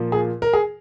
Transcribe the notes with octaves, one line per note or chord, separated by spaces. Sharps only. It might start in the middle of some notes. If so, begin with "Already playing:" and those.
Already playing: A#2 F3 A#3
G#4
A#4
G#4